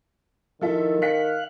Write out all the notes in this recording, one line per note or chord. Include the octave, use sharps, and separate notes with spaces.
D#3 F3 E4 F4 A4 E5
F5 G5 F#6 B6 C#7